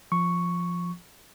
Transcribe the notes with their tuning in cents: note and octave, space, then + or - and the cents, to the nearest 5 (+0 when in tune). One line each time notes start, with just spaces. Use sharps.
F3 +0 C#6 +0